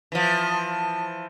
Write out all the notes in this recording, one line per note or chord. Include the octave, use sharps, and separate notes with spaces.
E3 F3